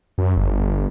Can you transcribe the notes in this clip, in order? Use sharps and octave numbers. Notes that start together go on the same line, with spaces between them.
F#2
G1
G1